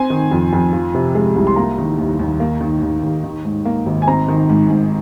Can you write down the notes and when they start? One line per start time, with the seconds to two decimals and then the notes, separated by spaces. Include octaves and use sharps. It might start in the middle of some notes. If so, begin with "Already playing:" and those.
Already playing: C4 G#5
0.10 D#3
0.31 F2
0.53 F2
0.73 F3
0.94 C3
1.15 G#3
1.36 C2
1.47 C6
1.56 A#3 A#5
1.78 D#3
1.98 D#2
2.19 D#2
2.40 A#3
2.61 D#3
2.82 D#2
3.03 D#2
3.24 D#3
3.45 G#2
3.65 A#3
3.86 G#1
4.02 G#5
4.07 C4 A#5
4.28 D#3
4.50 G#2
4.69 G#2